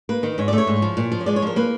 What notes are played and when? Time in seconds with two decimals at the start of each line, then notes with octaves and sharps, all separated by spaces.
0.09 A#3 B4
0.23 D#3
0.38 G#2 C#5
0.48 D5
0.53 A3
0.58 C#5
0.67 G#2
0.82 F3
0.97 A#2
1.12 F3
1.21 C#5
1.26 G#3 D5
1.36 C#5
1.42 F3 A#4
1.56 A#3 B4